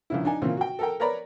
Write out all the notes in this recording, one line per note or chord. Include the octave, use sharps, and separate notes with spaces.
A#1 C#3 E4
D4 D#4 G#5
A#2 C#3 E3 A#3 C4 F4
F#4 G5
A4 A#4 G5
A#4 B4 C#5 D5 A#5 B5